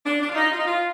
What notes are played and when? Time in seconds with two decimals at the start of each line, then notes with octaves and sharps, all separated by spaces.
0.05 D4
0.20 D4
0.29 F4
0.35 D#4
0.51 F4
0.58 D#4
0.66 F4